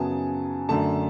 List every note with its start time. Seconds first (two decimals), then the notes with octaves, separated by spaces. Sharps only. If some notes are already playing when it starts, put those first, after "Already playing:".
Already playing: F#2 C#3 F#3 B3 G#5 A5
0.69 F#2 D3 A3 A5